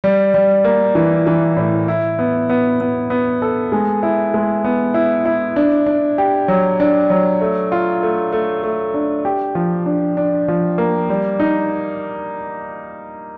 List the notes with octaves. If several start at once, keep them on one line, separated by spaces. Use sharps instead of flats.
G3
G3
A#3
E3
E3
A2
E4
B3
B3
B3
B3
A4
G#3
E4
G#3
B3
E4
E4
D4
D4
G4
F#3
D4
F#3
A3
F4
A3
A3
A3
D4
G4
F3
D4
D4
F3
A#3
G3
D#4